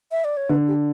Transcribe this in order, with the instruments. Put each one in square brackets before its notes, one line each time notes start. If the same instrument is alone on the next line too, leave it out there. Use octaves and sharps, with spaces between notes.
[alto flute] E5
D5
C#5
[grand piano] D3 [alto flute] B4
[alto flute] G4